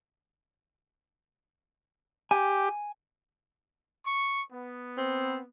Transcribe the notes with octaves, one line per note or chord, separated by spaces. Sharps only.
G4 G#5
C#6
B3
C4